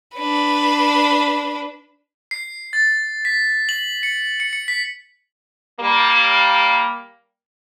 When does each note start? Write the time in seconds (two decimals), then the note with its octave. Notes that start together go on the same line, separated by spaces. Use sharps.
0.17 D4 B4
2.31 C7
2.73 A6
3.25 B6
3.69 F#7
4.03 C#7
4.40 C#7
4.53 C#7
4.68 B6
5.80 G3 A#3